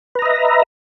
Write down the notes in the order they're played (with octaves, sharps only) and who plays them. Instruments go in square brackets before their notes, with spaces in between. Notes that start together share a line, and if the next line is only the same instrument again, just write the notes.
[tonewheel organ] B4
A#5
D#5
E5